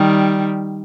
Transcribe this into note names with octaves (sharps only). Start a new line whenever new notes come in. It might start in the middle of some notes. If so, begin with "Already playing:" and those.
Already playing: D#3 G3